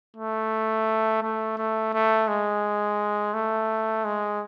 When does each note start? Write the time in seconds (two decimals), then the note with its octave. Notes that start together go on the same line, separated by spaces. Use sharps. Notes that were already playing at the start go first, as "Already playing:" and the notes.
0.17 A3
1.23 A3
1.58 A3
1.93 A3
2.28 G#3
3.34 A3
4.04 G#3